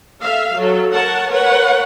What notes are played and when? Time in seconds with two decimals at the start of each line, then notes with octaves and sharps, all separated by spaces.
0.22 A4 E5 F5
0.54 F#3 A4
0.92 A#4 C#5 F#5 A5
1.30 A#4 B4 C#5 F#5